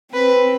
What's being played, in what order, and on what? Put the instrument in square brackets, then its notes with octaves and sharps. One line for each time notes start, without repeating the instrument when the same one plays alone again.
[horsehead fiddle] C4 [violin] B4